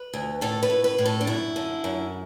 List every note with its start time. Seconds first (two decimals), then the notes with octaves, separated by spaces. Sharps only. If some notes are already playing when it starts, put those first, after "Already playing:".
Already playing: B4
0.13 D2
0.41 A2 A4
0.63 B4
0.70 A2
0.84 B4
0.98 A2
1.06 A4
1.21 D4
1.27 F#2 E4
1.56 D3
1.84 F#2